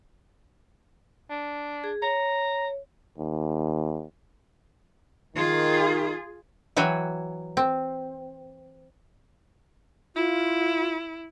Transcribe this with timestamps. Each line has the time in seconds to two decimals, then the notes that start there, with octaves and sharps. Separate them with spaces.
1.30 D4
1.84 G#4
2.02 C#5 A#5
3.18 D#2
5.36 D#3 F4 G#4
6.76 E3 F#3 F#4 G5 G#5
7.57 C4
10.16 E4 F4